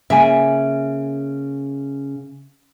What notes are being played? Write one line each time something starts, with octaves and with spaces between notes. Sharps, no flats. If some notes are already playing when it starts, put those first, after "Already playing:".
C#3 A#3 E5 G#5